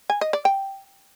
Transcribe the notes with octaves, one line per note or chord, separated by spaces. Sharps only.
G#5
D#5
D5
G5